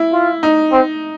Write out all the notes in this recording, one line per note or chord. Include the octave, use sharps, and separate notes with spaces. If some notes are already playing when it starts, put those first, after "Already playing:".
Already playing: E4
F4
D#4
C4